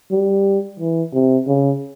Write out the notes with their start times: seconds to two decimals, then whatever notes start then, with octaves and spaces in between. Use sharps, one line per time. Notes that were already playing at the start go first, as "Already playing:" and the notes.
0.11 G3
0.79 E3
1.13 C3
1.47 C#3